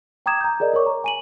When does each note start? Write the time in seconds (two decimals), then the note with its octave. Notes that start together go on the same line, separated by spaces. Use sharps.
0.26 G5 A#5 D6 D#6 G#6 E7
0.41 A#5 G6
0.60 G#4 A#4 D5 D#5
0.74 A#4 C#5 C#6 D6
0.86 A#5
1.04 G#5 D#7 F#7